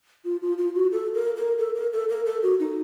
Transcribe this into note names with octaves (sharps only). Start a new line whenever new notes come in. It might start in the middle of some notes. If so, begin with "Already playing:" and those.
F4
F4
F4
F#4
A4
A#4
A#4
A4
A#4
A4
A#4
A4
F#4
D#4